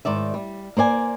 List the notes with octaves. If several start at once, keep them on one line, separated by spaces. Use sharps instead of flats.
G#2 D#3 D5 E5
G3
A#3 C5 D5 G#5